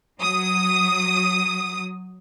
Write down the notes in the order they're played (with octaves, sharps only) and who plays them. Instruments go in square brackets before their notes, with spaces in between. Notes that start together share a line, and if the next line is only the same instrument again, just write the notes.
[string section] F#3 D#6